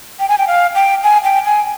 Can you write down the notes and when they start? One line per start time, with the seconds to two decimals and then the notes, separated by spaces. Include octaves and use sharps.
0.19 G5
0.29 G#5
0.38 G5
0.47 F5
0.75 G5
1.03 G#5
1.24 G5
1.45 G#5